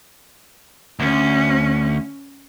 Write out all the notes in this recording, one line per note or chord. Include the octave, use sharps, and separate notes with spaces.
D2 C#4